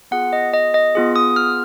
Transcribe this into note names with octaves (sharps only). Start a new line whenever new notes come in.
B3 F4 G#4 F#5
D#5
D#5
D#5
B3 F4 G#4
D#6
F6